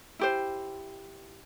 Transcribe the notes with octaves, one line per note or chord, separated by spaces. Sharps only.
E4 G4 C5